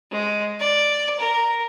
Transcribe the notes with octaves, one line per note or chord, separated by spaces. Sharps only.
G#3
D5
A#4